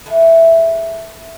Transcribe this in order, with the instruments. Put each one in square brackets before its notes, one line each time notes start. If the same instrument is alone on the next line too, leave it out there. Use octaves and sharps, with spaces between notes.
[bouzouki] E3 G#3 A3